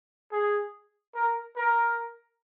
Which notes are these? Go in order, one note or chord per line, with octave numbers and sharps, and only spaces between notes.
G#4
A#4
A#4